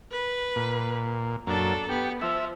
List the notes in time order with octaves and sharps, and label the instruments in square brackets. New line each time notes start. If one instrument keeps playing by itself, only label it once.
[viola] B4
[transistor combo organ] A#2
[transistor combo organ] F#2 A#3 [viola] D4 A4
[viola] B3 [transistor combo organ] G4
[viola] F3 [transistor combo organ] E5